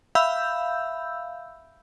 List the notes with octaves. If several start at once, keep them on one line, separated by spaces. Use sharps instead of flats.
E5 F5 B5 E6 G6